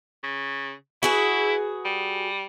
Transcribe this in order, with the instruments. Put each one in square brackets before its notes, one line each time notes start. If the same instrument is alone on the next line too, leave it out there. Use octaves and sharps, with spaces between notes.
[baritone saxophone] C#3
[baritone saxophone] E4 [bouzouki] F#4 G#4 B4
[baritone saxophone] G3